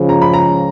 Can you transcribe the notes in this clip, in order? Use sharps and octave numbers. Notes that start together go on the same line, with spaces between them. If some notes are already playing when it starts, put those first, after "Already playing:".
Already playing: C#2 C#3 F3
A#5
B5
A#5